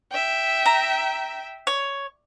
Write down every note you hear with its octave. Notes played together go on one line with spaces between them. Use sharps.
E5 G5
A#5
C#5